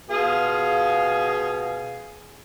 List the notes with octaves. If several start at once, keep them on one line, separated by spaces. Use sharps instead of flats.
B2 F4 G#4